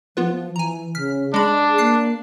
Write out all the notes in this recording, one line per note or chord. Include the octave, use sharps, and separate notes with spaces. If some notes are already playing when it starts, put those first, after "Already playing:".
F3 B3 F4 B4
E3 G#5 A#5
C#3 F6 B6
G#3 D4 G#4 B5
A#3 F#6 C7